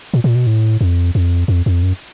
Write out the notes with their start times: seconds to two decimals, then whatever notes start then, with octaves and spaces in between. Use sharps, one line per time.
0.14 A#2
0.24 A#2
0.35 B2
0.47 A2
0.81 F2
1.15 F2
1.48 F2
1.66 F2
1.83 F#2